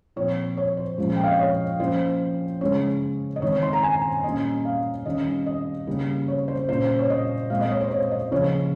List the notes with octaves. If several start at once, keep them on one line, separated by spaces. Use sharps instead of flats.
A#2 F3 C4 C#5
C#5
C5
A#2 F3 G#3 C#4
G5
F5
D#5
C#5
F3 A#3 C#4 C5
C#3 G#3 C#4 C#5
D#5
D#3 G#3 C4 C#5
C#5
C6
A#5
G#5
A#2 G3 A#3 C#4 D#5
F5
D#3 G3 C#4 D#5
D#5
C#3 G3 A#3
C#5
C5
A#2 G3 C#4 C5
C#5
D#5
A#2 G#3 C4 F5
D#5
C#5
C5
C#5
D#5
C#3 F3 A#3 C#4 C#5